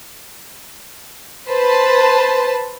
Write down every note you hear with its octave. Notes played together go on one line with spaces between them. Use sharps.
B4 C5 A5